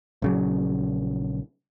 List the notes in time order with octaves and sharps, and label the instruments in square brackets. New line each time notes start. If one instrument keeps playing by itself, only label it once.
[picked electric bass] A#1 C#3 F#3